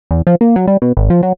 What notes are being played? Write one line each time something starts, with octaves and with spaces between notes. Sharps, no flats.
E2
F3
A#3
F#3
G3
B2
G#1
F3
F#3